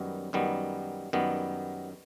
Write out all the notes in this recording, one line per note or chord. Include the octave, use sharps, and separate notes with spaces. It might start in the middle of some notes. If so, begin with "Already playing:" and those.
Already playing: F#2 D#3 G3 B3
F#2 D#3 G3 B3
F#2 D#3 G3 B3